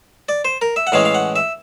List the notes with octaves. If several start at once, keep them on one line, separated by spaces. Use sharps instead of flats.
D5
C5
A#4
E5
F#5
A2 E3 G#3 C#4 F5
F5
F#5
E5